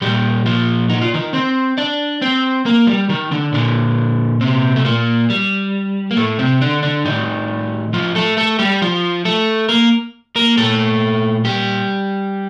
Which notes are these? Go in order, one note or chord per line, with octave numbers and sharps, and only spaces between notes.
A#2 G3 G4
F3 F4
D#4
F4
D#3 D#4
C4 C5
D4 D5
C4 C5
A#3 A#4
G3 G4
D#3 D#4
D3 D4
A#2 D3 D4
C3 C4
A3
A#2 A#3
G3
A#3
A2 A3
C3 C4
D3 D4
D3 D4
A2 D#3 D#4
F3 F4
A3 A4
A3 A4
G3 G4
F3 F4
A3 A4
A#3 A#4
A#3 A#4
A#2 A3 A4
G3 G4